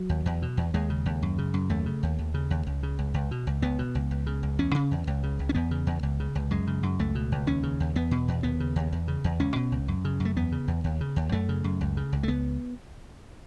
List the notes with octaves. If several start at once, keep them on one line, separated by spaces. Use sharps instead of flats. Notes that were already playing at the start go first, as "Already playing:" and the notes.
Already playing: F#3
D#2
E2
B2
E2
D#2 G#3
C#3
D#2
F#2
C#3
F#2
D#2 A3
C#3
D#2
D#2
C#3
D#2
C#2
C#3
C#2
C#2
B2
C#2
C#2 B3
B2
C#2
C#2
C#3
C#2
E2 C#4
C#3
E2
C#2
C#3
C#2
C#4
E2 B3
C#3
E2
C#2
C#3
C#2
F#2 G#3
C#3
F#2
C#2 A3
B2
C#2
D#2 C#4
C#3
D#2
E2 B3
B2
E2
D#2 B3
C#3
D#2
E2
C#3
E2
C#2 C#4
B2
C#2
F#2
C#3
F#2
A3
E2 B3
C#3
E2
D#2
C#3
D#2
F#2 A3
C#3
F#2
C#2
C#3
C#2
A3
C#2 B3